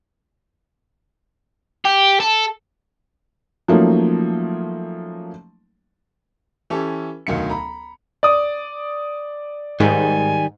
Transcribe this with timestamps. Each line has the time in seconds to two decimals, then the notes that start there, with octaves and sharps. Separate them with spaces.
1.85 G4
2.20 A4
3.68 F3 F#3 A3 A#3 C#4 D#4
6.70 E3 C#4 G4 A4
7.27 E1 D2 D#3 F#3 F5 C#7
7.50 A#5 B5
8.23 D5 D#6
9.80 G#2 D#3 G3 G#5